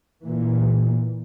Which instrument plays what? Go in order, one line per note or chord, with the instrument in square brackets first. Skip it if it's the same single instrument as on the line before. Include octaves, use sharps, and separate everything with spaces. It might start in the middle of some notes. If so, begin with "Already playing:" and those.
[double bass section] A#2 E3